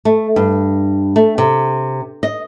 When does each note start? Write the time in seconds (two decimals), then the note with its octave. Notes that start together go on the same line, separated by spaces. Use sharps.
0.05 A3
0.36 G2
1.16 A3
1.38 C3
2.23 D#5